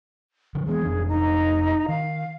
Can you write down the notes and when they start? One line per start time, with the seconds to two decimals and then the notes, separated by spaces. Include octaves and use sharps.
0.55 D3 F3
0.67 E3 G#3 B3 G#4
0.85 F1 F2 D4
1.08 D#4
1.89 D#3 F5